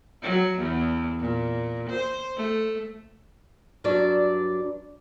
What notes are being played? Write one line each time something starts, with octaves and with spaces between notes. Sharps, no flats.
F#3
E2
A#2
C5
A3
G2 F#3 D4 D5